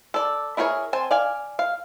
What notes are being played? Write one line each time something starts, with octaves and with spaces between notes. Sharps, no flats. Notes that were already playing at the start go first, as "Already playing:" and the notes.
A4 D5
E4 G#4 A#4 C5 C#5
C4 C5 G#5 A5
D5 F5 G#5
F5